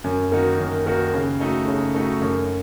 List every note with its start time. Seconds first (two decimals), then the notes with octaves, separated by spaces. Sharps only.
0.04 F#2
0.32 D#3 A#3 D#4 F#4
0.59 F#2
0.86 D#3 A#3 D#4 F#4
1.14 C#3
1.40 A3 D#4 F#4
1.68 C#3
1.95 A3 D#4 F#4
2.22 F#2